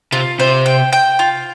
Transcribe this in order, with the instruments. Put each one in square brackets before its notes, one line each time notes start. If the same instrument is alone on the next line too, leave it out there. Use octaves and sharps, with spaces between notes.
[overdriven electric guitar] C3 [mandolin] F4
[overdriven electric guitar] C3 [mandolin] C5
[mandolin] G5
G5
F4